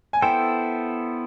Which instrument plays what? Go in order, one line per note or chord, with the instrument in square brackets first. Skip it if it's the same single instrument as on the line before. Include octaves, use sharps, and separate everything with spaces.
[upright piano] G#5
[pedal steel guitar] B3 E4 A4 C5 [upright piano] G5